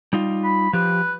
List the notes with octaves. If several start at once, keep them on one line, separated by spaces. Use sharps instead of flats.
G3 D#4 F4
B5
F3 G4 B4